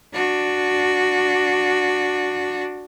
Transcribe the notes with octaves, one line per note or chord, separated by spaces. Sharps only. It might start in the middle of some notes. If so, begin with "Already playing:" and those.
D4 F#4